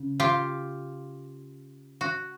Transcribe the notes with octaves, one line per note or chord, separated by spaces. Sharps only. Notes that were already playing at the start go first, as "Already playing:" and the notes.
Already playing: C#3
F4 G4
F#4